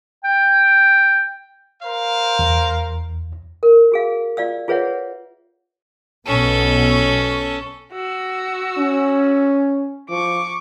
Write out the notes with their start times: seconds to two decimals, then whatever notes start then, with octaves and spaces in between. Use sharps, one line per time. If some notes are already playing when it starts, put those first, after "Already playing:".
0.24 G5
1.82 A#4 C5 F5
2.39 E2
3.63 A#4
3.92 F#4 G#4 F5
4.37 F4 D5 F5 E6
4.68 F4 G#4 B4 C#5 E5 F#5
6.27 B1 B2 C#4 A4
7.93 F#4 E6
8.78 C#4
10.10 F3 C#6 D6